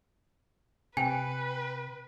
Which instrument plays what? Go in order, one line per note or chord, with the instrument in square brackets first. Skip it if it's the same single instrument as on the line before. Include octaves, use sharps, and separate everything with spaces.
[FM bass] C3 [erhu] B4 [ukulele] G5 [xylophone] G#5